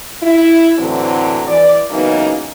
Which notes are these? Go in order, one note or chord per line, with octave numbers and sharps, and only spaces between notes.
E4
A2 D3 E3 F#3 C4
E3 D5
C#3 E3 F#3 A#3 B3 D#4